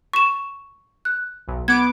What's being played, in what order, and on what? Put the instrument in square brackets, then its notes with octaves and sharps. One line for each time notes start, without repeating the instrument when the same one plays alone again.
[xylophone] C#6 E7
F#6
[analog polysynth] B1
[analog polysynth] B3 D6 [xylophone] G#6